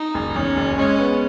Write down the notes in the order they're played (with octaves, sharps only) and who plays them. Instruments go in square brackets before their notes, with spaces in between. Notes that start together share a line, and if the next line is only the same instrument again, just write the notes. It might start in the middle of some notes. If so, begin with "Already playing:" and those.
Already playing: [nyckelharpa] D#4
[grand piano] F#1
[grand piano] E2 [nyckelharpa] C#4
[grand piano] F#1
[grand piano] G#3 [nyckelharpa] C#4
[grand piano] B3